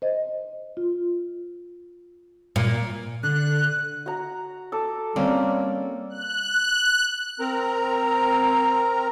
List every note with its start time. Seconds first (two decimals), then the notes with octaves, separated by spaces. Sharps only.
0.02 C5 D#5
0.77 F4
2.56 A#2
3.23 D3 F#6
4.06 F#4 A#5
4.72 A4 D6
5.16 G3 A#3 C4 C#4
6.09 F#6
7.40 C4 A#4 A#5